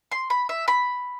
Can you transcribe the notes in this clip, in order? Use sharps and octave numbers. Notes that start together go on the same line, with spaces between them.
C6
B5
E5
B5